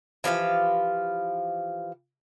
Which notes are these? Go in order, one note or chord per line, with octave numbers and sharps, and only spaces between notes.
E3 F3 G4 F5